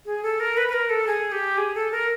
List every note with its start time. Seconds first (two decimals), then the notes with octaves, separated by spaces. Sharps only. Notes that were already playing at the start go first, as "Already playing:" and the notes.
0.05 G#4
0.23 A4
0.40 A#4
0.57 B4
0.68 B4
0.73 A#4
0.90 A4
1.07 G#4
1.32 G4
1.58 G#4
1.75 A4
1.91 A#4